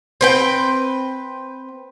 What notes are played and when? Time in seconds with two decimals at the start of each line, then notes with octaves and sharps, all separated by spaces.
0.21 C4 B4 G5